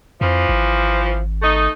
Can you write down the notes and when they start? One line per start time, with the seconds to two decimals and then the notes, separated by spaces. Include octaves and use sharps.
0.21 F2 E3 F3
0.49 G#1
1.42 A3 D#4